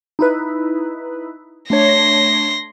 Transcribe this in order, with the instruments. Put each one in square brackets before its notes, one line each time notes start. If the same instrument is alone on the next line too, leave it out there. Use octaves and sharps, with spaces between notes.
[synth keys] D#4 E4 B4
[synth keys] A3 D4 C#5 [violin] C6 A#6